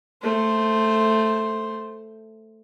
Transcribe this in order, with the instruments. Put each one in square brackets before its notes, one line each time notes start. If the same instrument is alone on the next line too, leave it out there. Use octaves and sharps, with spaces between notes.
[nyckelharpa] A3 C5